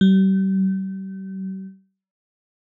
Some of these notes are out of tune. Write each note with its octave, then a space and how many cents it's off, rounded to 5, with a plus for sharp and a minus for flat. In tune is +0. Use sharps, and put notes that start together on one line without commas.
G3 -40